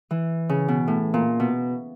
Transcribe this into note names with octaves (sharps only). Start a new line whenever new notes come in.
E3
C#3
B2
A2
A#2
B2